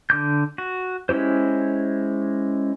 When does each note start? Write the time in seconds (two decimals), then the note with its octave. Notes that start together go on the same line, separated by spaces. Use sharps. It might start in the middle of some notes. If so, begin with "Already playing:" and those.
0.10 D3 D6 G6
0.58 F#4
1.09 G#3 C#4 E4 G4 C5